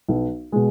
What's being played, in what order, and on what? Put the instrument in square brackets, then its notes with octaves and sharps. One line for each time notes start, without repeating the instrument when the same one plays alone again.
[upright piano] B1
B2 G#3